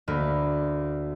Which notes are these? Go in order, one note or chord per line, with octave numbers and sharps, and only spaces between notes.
D2 A#3 B5